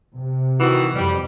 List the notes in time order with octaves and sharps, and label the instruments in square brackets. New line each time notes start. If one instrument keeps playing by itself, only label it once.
[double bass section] C3
[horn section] D#3 E3 F#4
[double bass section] F2 [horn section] G3